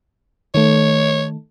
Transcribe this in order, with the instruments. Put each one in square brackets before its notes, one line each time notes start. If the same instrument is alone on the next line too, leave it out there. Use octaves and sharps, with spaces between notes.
[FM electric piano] D#3 A3 [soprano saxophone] C#5